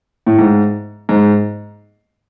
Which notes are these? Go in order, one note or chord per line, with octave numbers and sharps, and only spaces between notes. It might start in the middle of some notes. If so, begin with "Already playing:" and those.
A2
G#2
G#2